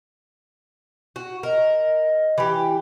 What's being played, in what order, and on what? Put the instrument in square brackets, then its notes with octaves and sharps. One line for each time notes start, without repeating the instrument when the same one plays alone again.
[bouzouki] F#4
[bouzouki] A#4 [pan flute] D#5
[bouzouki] E3 G4